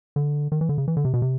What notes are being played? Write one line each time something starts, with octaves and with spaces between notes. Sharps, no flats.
D3
D#3
E3
D3
C#3
E3
D3
C3
B2
C3